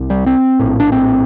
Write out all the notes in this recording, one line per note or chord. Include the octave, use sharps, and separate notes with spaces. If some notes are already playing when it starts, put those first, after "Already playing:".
Already playing: C2 C3
G3
C4
A#1 A2
D4
C4